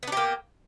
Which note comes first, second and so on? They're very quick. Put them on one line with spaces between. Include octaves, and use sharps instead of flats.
B3 D4 G4 A#3